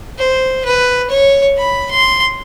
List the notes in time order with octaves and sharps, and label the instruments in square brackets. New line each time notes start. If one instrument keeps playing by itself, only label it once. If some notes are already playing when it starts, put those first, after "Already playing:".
[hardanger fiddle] C5
B4
C#5
B5
C6